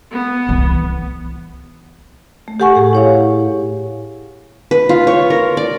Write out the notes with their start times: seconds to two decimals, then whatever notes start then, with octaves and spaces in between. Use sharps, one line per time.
0.12 B3
0.49 C2 A2 E3
2.48 A3
2.60 G4 A4 F#5 G#5 C#6
2.76 A2 G#4
2.93 E4 C#5 F5
4.71 B4
4.89 F4
5.07 C#5
5.30 A#4
5.57 D5